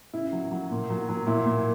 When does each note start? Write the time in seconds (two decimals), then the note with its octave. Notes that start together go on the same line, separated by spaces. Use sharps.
0.14 C#3 E4
0.32 F#3
0.51 F#3
0.70 A#2
0.90 F#3
1.09 F#3
1.27 A#2 E4
1.46 A#2